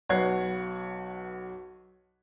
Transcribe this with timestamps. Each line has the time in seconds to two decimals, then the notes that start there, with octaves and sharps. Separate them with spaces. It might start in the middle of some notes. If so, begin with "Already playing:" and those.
0.09 B1 B4 C#5 F#5 G#6 C7